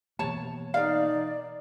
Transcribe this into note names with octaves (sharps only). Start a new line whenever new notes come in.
B2 E3 A#3 C#5 A5
D#4 A#4 D5 F5